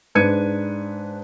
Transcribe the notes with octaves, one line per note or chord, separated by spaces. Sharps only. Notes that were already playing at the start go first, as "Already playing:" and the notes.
G#2 D4 B4 G#6 C#7 D#7